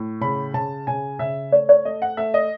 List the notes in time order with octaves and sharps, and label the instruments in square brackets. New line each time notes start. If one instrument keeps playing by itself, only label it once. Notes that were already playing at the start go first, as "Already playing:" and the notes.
Already playing: [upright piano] A2
C#3 B5
C#3 A5
C#3 G#5
C#3 E5
A3 C#5
C#5
A3 D#5
F#5
A3 E5
D#5